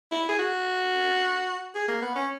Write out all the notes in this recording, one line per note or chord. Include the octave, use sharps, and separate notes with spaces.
E4
G#4
F#4
G#4
A#3
B3
C#4